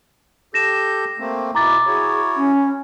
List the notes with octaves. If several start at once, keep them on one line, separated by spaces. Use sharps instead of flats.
G4 A4 G6 A#6 E7
A3 A#3 C4
B2 E4 A#5 D6 A6
E4 F#4 G#4 C#5
C#4